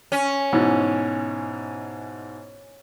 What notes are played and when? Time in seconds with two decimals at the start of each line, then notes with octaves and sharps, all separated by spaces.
0.12 C#4
0.53 G#2 B2 E3